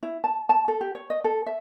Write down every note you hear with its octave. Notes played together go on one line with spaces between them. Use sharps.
E4
A5
A5
A4
G4
C#5
D#5
A4
E5